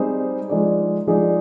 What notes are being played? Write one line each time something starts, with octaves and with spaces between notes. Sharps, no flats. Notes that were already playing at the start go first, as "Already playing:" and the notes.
Already playing: G3 C4 D#4 G#4 C5
F3 G#3 D#4 G#4 D5
F3 G#3 D#4 G#4 D5